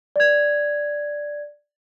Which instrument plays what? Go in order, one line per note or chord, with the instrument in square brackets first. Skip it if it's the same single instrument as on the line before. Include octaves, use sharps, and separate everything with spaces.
[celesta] D5 G#6